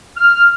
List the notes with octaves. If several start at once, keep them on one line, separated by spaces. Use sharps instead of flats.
F6